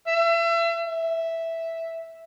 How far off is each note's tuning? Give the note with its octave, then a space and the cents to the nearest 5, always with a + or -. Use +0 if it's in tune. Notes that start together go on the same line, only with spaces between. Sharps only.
E5 +35
E5 -5